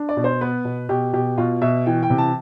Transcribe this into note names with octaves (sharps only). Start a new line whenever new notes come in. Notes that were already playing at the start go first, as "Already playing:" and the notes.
Already playing: D4
D5
B2
C5
B3 B4
B2
B2 G4
B2 G4
B2 F4
B2 E5
E3 G5
G5
C3
A5